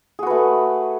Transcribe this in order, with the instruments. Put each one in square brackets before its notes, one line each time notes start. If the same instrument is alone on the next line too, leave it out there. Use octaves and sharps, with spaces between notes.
[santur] G#4
F#4
B4
A3